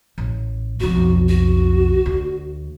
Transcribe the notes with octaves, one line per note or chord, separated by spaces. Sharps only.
A1
B1 F2 F#4
F#4
D2